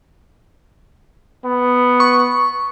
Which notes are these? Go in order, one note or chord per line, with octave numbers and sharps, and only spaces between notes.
B3
C#6